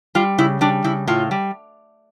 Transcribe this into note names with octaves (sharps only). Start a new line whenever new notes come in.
G3 F4
C#3 E4
G3 D4
C#3 E4
A2 F4
G3